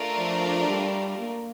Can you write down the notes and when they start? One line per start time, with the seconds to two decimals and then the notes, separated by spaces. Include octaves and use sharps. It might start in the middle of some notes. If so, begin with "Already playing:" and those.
Already playing: A3 D4 F4 A#4 D5
0.18 F3
0.68 G3
1.19 A#3